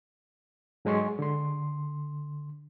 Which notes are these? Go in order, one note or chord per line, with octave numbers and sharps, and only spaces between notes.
G#2 F#3 G#3 G#5 C6 C#6
D3 C6